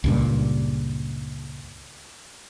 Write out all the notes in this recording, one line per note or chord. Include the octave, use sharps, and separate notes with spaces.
C#2 G2 A#2